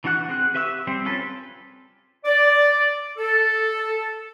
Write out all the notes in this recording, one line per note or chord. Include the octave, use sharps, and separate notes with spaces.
E3 D4 F#4 F#5 F#6
C4 G#4 F#6
G4 B4 E5 C#6 E6
G3 C4 G4
C#4 F4 G#4 A4 B4
D5
A4